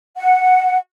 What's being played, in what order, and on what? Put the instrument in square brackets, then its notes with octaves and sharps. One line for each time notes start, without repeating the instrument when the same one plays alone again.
[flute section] F#5